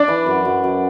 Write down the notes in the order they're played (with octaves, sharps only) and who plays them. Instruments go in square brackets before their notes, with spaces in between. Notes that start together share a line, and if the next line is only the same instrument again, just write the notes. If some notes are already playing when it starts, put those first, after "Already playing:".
Already playing: [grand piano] D4 D5
[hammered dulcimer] E3
F#2
F#2
F#2